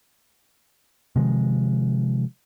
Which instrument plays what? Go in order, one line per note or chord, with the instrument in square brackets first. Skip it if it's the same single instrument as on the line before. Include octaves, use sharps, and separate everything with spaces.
[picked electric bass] C3 D#3 F3 G#3